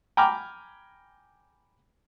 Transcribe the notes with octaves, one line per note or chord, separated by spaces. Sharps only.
G5 G#5 A#5 B5 D6 F6